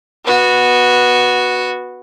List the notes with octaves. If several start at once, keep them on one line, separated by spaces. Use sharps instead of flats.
B3 F#4